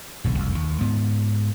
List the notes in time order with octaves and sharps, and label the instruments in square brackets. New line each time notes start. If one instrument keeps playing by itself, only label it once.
[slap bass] D#1 B1 D3
F#1 C2 F2
D#2
G#2 B3